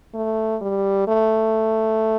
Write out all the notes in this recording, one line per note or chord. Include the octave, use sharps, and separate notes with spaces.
A3
G3
A3